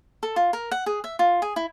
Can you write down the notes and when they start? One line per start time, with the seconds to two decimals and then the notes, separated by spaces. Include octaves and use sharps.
0.23 A4
0.36 F4
0.53 A#4
0.71 F#5
0.86 G#4
1.04 E5
1.19 F4
1.42 G#4
1.56 E4